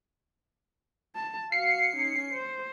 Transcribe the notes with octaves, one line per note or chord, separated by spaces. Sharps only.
A5
F#4 F5 C7 C#7
C#4 D#4
C5